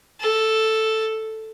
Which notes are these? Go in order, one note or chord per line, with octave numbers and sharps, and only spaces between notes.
A4